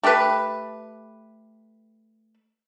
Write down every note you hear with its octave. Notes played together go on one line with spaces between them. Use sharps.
A3 G4 A4 B4